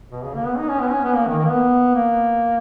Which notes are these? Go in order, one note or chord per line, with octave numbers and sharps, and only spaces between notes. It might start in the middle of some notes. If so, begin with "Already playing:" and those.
B2
C#3
A#3
B3
D#4
C#4
B3
C#4
B3
A#3
D#3
D#3
A#3
B3
A#3